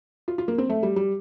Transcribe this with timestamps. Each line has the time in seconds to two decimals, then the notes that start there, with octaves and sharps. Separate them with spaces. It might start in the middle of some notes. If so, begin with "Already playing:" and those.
0.28 F4
0.38 F4
0.48 A#3
0.58 C4
0.69 A3
0.83 G3
0.96 G3